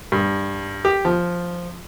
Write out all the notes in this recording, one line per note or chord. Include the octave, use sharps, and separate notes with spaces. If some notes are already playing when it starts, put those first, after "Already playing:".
G2
G4
F3